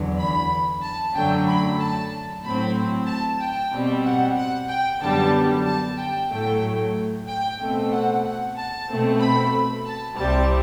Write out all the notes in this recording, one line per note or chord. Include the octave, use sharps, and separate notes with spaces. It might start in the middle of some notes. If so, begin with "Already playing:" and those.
Already playing: E2 D3 F#3
B5
A5
F#2 D3 F#3 A3 G5
B5
A5
A2 F#3 C4 B5
A5
G5
B2 G3 C4
F#5
F#5
G5
F#2 D3 G3 B3 A5
A5
G5
A2 F#3 A3 G5
G5
B2 A3 C4
F#5
F#5
A5
B2 A3 C4
B5
A5
C2 C3 G3 C4 A5